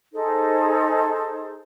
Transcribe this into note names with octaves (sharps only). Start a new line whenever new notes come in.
D#4 G#4 A4 C5